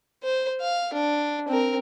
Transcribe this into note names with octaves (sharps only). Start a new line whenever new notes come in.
C5
F5
D4
C4 A#4